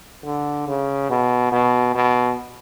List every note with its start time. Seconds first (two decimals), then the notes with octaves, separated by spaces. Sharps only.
0.25 D3
0.68 C#3
1.10 B2
1.52 B2
1.95 B2